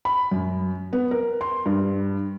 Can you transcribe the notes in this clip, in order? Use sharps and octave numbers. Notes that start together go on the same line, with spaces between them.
B5
F#2
B3
A#4
C6
G2